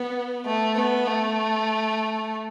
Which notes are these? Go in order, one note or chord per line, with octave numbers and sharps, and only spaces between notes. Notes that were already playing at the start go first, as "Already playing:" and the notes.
Already playing: B3
A3
B3
A3